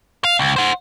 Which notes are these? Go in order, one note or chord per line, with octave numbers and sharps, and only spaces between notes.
F5
C#2
C5 F#5